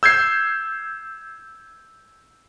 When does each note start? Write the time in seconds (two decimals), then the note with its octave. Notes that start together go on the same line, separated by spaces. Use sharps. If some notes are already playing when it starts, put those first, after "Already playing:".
0.03 E6 G6 G#6 C7